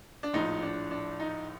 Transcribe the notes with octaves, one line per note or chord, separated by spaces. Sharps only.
D4
A#1 A2 F3 D#4
D4
D4
D#4